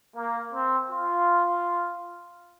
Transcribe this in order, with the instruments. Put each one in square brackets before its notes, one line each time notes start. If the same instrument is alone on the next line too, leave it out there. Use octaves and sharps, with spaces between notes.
[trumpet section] A#3
C4
F4